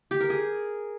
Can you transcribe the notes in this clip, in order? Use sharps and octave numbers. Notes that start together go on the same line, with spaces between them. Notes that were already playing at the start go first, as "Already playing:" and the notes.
G4
A#4
G#4